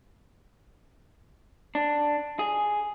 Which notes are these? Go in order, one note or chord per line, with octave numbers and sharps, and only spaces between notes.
D4
G#4